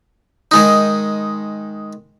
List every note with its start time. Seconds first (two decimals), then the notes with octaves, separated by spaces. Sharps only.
0.51 D#3 G#3 D#4